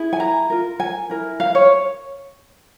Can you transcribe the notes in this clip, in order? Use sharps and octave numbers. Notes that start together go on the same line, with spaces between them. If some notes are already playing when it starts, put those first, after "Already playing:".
Already playing: E4 G#4
G#5
A#5
F4 A#4
G#5
E4 A#4
F5
C#5